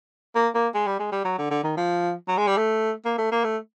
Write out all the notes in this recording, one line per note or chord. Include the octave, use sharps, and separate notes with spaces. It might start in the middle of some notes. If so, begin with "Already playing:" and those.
A#3
A#3
G#3
G3
G#3
G3
F#3
D3
D3
D#3
F3
F#3
G#3
G3
A3
A#3
A3
A#3
A3